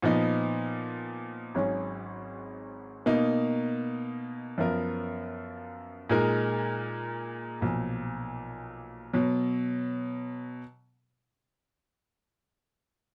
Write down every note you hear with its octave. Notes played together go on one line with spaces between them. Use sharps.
A#2 F3 B3 D#4
G#1 G#2 F#3 C#4 G#4
B2 A#3 D#4
F#2 F3 B3 F4 A#4
A#2 G#3 D#4 A#4
B1 A#2 F3
B2 F#3